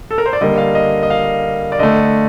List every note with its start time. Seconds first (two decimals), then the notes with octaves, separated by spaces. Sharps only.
0.11 A4
0.18 A#4
0.26 C5
0.33 D5
0.41 D3 G3 A#3 D#5
0.58 F5
0.75 D#5
1.03 D#5
1.10 F5
1.72 D5
1.79 D3 A3 D#5